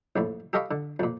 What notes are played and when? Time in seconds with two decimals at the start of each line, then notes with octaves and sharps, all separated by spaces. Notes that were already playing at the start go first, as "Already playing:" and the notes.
0.16 A#1 F2 A2
0.53 G4 A4 D#5 F5 B5 C#6
0.71 D3
0.99 F2 A#2